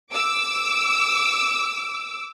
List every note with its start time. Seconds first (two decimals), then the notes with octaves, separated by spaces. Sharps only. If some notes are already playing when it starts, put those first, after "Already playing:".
0.11 D6 E6